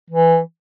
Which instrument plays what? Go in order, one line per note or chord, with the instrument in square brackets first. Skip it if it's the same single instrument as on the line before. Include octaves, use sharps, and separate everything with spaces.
[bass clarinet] E3